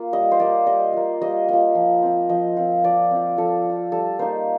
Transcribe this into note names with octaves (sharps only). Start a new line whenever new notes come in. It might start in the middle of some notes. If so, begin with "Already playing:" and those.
Already playing: A#3 F4
G3 D#5
C5
A#3 F4 D5
G3 D#5
A#3 F4
G3 D#5
A#3 F4 D#5
F3
C4 F4
F3 D#5
C4 F4
F3 D5
C4 F4
F3 A4
C4
F4
G3 A4
A#3 D#4 C5